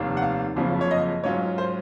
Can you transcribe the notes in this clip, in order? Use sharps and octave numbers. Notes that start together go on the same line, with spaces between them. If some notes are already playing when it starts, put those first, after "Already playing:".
Already playing: F1 D#2 D#3
F#5
F5
F#1 F2 C#3 F3
C#5
D#5
G#2 F#3 C#4 F4 C#5
C5